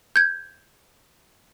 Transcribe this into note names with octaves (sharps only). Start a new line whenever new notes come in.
G6 G#6